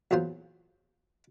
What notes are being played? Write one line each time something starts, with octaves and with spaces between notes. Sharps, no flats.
E2 A#2 F#3 F4 C5 C6